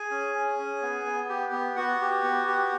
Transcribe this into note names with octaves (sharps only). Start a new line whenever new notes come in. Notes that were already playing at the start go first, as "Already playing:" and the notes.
Already playing: G#4 G#5
C#4
C#4
C#4
B3
B3
G4
B3
B3 F#4 F#5
G4
B3
G4